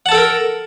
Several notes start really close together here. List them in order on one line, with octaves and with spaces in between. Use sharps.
F#5 A5 A4 G5 A#4